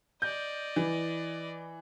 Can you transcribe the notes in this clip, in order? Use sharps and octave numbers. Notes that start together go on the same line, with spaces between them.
D5 D#5 G6
E3